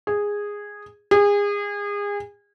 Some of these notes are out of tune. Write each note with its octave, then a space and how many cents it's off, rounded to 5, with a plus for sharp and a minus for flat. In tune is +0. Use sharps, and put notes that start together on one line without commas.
G#4 -10
G#4 -30